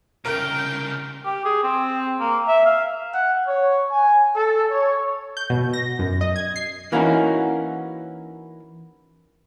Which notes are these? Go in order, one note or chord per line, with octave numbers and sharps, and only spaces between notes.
C2 C#3 A#4 G5 F6 D7
G4
G#4
C4
A#3
E5
F5
F#5
C#5
G#5
A4
C#5
G6
B2
A#6
F#2
D#5
G#6
C7
E3 A#3 C#4 D#4 F#4